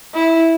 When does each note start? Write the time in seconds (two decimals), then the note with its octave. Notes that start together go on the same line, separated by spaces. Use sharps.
0.14 E4